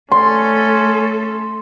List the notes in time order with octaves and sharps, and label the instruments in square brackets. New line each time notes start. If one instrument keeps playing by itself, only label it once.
[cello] A3 A4 [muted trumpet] C#4 [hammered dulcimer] C6